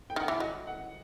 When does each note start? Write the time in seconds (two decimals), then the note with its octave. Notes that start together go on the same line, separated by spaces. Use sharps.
0.10 G5
0.16 D#3 F#5
0.28 E3 E5
0.40 F#3 D#5
0.67 F#5